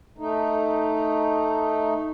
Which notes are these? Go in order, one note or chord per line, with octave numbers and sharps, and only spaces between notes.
A3 D#4